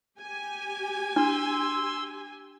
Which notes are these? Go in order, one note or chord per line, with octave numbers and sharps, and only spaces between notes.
G4 G#5
D4 C6 E6